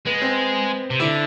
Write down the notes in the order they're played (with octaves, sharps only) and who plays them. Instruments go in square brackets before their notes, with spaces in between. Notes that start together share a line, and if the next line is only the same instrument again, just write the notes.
[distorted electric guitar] G#3 [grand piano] B3
[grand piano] C4
[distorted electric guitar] C3
[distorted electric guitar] D3 [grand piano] E4